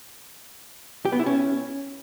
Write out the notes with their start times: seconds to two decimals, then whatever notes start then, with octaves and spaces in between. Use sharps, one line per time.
1.05 G4
1.12 B3
1.19 E4
1.26 C#4